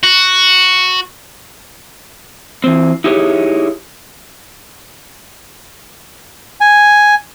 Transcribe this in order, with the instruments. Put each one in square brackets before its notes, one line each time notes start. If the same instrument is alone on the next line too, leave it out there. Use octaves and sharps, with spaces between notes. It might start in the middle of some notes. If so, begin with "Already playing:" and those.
[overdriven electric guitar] F#4
[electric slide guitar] E3 C4
D#4 E4 G4 G#4 A#4 C#5
[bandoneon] G#5